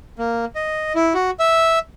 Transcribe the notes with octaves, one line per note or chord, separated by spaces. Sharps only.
A#3
D#5
E4
F#4
E5